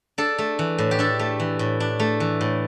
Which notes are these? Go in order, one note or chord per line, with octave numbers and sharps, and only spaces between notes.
D4 A4
A3
E3
A2
G4
D4 A4
A3
E3
A2
D4
A3
E3
A2